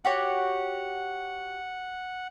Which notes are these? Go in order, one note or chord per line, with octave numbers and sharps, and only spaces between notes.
F#4 G4 C#5 F#5